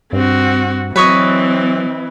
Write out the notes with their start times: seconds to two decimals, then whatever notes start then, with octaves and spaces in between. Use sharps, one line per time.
0.13 G2 C4 F#4
0.96 E3 F#3 C4 B4 C#5 D#5